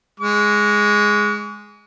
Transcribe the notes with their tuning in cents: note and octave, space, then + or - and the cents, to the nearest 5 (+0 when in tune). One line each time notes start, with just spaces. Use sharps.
G#3 +0 C#6 +35